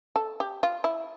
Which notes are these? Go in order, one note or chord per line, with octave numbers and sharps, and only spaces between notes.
A4
G4
F4
E4